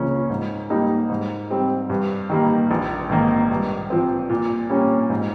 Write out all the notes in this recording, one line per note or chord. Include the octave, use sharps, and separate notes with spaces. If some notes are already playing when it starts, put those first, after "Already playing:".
Already playing: C#2 C#3 F3 A#3 C#4
G#2
G3 A#3 D#4
G#2
G3 C4
G2
D#3 G3 A#3
A#1
G#2 D#3 A#3
G2
F3 C4
A#2
G3 A#3 C#4
G#2